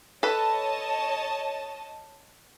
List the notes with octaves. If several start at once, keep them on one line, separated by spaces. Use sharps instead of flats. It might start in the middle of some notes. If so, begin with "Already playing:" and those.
A4 B4 C#5 D#5 A5